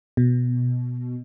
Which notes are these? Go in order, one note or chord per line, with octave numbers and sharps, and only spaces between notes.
B2